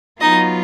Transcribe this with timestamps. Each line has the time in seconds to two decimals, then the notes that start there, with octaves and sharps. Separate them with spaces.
0.21 F#3 B3 D#4 F4 D#5